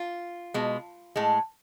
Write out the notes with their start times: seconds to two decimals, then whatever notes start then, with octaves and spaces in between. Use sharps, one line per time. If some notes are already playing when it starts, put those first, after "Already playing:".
Already playing: F4
0.54 B2 G#3
1.16 A2 G#3